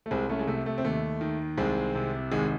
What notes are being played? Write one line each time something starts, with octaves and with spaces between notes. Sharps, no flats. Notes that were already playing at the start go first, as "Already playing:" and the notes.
A3
C2 G#3 C4
A3 C#4
G#3
C3 A3
A3
C4
D#2 A3
D#3
C2 G#3 C4
C3
G#1 G#3